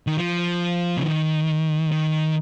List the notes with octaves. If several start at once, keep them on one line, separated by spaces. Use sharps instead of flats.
D#3
F3
C#3
D#3
D#3